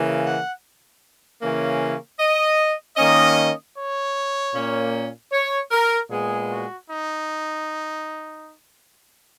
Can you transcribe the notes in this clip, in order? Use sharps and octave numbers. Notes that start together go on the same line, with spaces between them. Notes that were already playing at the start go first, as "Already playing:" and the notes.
Already playing: C#3 E3 A#3
F#5
C#3 E3 A#3 C#4
D#5
D#3 A#3 C#4 D#5
C#5
A#2 A#3 C#4
C#5
A#4
A#2 G#3 B3 G#4
F#4
D#4